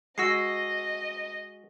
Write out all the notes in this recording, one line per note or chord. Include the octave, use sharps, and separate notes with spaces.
G#3 F#4 D#5 E6 A#6 C7